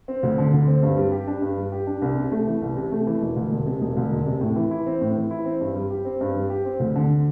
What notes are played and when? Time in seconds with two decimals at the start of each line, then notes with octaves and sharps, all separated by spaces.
0.08 C4
0.23 D2
0.38 D3
0.53 D2
0.67 C4
0.83 G2
0.97 G3
1.12 G4
1.27 D4
1.42 G2
1.57 G3
1.72 G4
1.87 D4
2.02 C2
2.17 C3
2.31 A3
2.47 E3
2.62 C2
2.76 C3
2.92 A3
3.07 E3
3.22 E1
3.36 D2
3.51 E1
3.66 C3
3.81 E1
3.97 D2
4.12 E1
4.26 C3
4.41 A2
4.56 E3
4.71 E4
4.86 C4
5.01 A2
5.16 E3
5.31 E4
5.45 C4
5.61 G2
5.75 G3
5.91 G4
6.05 C4
6.21 G2
6.36 G3
6.50 G4
6.65 C4
6.80 D2
6.95 D3